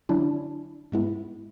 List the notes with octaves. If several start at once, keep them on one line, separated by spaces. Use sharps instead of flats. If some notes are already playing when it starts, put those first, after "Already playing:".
D3 F#3 C#4 D4 E4
G#2 G#3 B3 E4